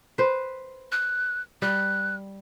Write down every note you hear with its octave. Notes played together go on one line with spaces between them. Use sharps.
B4 C5
F#6
G3 F#6